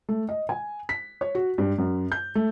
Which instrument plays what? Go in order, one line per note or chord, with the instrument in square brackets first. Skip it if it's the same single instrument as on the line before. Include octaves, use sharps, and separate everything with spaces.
[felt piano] A3
D#5
G#5
B6
C#5
F#4
G2
F#2
G6
A3